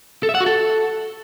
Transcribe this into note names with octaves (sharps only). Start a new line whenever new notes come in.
A4
E5
F#5
F#4
A4